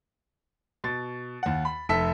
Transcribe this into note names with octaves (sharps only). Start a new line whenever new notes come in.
B2 A6
D#2 F#5
B5
F1 A4 E5 E6 B6